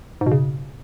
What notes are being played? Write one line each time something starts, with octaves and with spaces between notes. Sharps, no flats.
G#2
B2
C#3